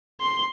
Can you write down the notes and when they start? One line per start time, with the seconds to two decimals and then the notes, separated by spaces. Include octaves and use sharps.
0.21 C6